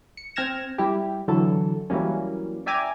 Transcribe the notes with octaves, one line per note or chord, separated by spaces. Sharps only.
C#7
C4 G5 F6 G#6 A#6 E7
G3 E4 G4
D3 E3 F#3 A4
E3 F#3 G3 A#3 C#4
D5 E5 G5 G#5 A#5 D6